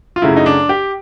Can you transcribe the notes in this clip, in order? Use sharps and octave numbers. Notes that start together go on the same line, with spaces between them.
F4
F#2 C#3 F#3 A3 E4
D#4
D4
G4